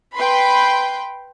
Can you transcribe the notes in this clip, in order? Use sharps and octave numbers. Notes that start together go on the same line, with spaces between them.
B4 G5 B5 C6